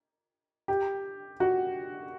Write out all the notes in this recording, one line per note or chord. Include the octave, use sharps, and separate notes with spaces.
G4
F#4